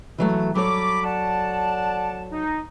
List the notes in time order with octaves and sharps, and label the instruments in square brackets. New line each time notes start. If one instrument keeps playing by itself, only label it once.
[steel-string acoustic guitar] E3 F#3 A3
[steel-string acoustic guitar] F#3 A4 C#5 [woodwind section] G3 B5 D6
[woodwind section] D5 F#5 A5
D#4